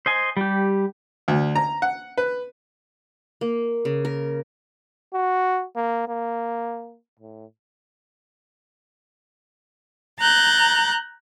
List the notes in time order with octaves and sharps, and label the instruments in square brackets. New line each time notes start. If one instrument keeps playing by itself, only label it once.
[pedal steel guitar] C5 D#5 G#5
G3 G4
[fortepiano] D2
A#5
F#5
B4
[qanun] A#3
C#3
A#4
[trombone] F#4
A#3
A#3
A2
[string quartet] A#5 F#6 G6 A6